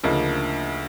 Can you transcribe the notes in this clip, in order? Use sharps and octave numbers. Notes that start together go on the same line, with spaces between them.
D2 C#3 F3 A#3 D#4